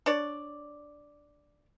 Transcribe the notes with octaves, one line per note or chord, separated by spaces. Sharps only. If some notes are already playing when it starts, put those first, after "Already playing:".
D4 C#5 D5